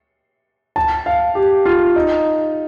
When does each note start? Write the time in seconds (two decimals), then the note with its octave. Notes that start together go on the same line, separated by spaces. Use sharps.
0.76 A5
1.06 F5
1.35 G4
1.65 F4
1.96 D#4